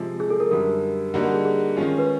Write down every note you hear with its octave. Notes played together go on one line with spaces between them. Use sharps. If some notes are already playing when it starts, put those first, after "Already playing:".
Already playing: C3 F3 G#3
G#4
A4
A#4
F#2 D3 G3 A#4
D3 G3 A#3 D#4 F#4
A#4
G#4
G#4
D#3 G#3 C#4 F4
B4